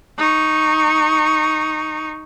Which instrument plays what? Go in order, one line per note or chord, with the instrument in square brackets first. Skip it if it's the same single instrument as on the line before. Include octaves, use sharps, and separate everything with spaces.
[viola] D#4 C#6